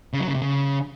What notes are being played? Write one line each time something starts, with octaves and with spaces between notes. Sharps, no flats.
C#3
F#3
C#3
C3
C#3